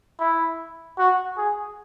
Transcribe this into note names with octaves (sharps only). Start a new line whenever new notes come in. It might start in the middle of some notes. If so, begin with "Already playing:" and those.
E4
F#4
G#4